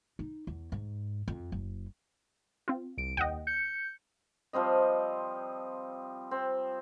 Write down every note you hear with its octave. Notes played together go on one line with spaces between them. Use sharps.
D#4
E2
G#2
F2
F#1
C4 F4
C2 D7
D#2 D#5 F#5 G5
G6 C#7
F3 G3 C4 D#5
C4